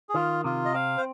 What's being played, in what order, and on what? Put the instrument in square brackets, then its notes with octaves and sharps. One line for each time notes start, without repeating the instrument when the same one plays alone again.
[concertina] G#4
[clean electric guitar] D#3 [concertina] F4
[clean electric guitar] C3 [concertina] F4
[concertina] D#5
[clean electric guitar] C4 [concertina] F5
[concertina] C5